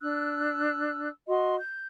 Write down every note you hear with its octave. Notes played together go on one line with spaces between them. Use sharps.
D4 E6 F#6
F#4 D#5 C6
G6